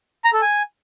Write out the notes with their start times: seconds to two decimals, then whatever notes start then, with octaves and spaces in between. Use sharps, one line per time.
0.25 A#5
0.33 A4
0.42 G#5